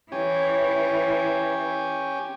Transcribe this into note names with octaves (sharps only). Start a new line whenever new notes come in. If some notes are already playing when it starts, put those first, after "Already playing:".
E3 C#4 G4 C#5 G#5